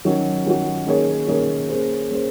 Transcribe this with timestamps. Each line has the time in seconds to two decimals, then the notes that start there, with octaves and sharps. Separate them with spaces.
0.05 D#3 F#3 C#4 F#4
0.46 D#3 F#3 C#4 F#4
0.86 D#3 A#3 C#4 G#4 C#5
1.28 D#3 A#3 C#4 G#4 C#5
1.69 A#3 C#4 G#4 C5
2.11 A#3 C#4 G#4 C5